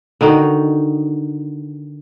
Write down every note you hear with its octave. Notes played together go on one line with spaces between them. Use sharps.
D3 D#3 D#4 F#4